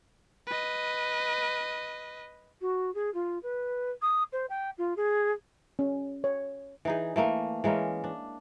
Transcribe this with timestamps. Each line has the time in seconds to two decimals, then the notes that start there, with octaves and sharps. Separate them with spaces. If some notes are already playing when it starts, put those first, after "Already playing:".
0.47 B4 D#5
2.61 F#4
2.94 G#4
3.14 F4
3.43 B4
4.02 D#6
4.32 C5
4.49 G5
4.78 F4
4.96 G#4
5.79 C#4
6.24 C#5
6.85 E3 D#4 G#4
7.16 E3 A3 A#3
7.64 E3 G#3 A#3 C#4
8.04 D4